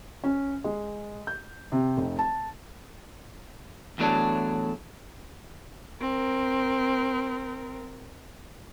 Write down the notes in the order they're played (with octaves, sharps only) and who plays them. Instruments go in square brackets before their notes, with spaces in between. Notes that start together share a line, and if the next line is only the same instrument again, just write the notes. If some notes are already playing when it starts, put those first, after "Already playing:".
[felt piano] C#4
G#3
G6
C3
F1
A5
[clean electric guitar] E2 A2 F#3 D4
[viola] C4 A#4